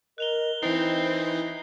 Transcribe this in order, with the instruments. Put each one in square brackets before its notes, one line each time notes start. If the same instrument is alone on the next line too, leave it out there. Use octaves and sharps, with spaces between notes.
[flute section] A#4 D#5 [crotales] F#6 F7 G7
[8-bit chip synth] E3 D#4 [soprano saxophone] C4 [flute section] E4 [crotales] C7